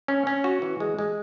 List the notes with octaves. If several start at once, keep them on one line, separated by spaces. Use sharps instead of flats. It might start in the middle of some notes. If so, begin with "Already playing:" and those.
C#4
C#4
F#4
E3
G#3
G#3